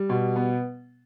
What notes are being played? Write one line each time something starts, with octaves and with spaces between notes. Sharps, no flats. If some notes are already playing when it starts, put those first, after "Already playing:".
Already playing: G3
B2
B3